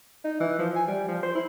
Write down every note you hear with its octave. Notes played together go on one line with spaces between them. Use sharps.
D#4
E3
F3
G#5
G3
F3
C5
E4